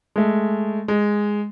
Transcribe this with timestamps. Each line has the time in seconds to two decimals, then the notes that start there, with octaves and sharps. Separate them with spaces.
0.16 G#3 A3
0.88 G#3